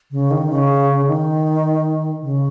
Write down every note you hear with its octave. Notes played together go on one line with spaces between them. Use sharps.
C#3
D#3
C#3
D#3
C#3